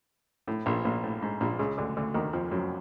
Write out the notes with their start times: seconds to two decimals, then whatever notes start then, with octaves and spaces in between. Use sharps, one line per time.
0.48 A2
0.66 A#1 A#2
0.85 A#1 A#2
1.04 A2
1.22 G#2
1.41 A#1 A#2
1.59 C#2 C#3
1.78 D2 D3
1.97 D2 D3
2.14 D#2 D#3
2.33 F2 F3
2.51 F#2 F#3